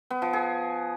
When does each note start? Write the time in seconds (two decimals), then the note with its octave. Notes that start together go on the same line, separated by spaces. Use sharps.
0.10 B3
0.22 F3
0.33 G#4